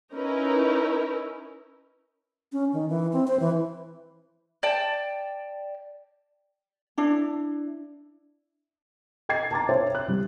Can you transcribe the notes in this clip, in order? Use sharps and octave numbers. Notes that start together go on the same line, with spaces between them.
C#4 D#4 E4 A#4 B4
C#4
D#3
E3
C4
C5
E3
D5 G5 A5
D4 E4
D#5 G5 G#6 A6 C7
A5 A#5 D6 A6
C5 C#5 E5 G5
F#6
G3